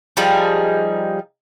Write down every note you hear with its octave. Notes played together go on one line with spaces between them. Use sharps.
F3 G3 D#4 G#4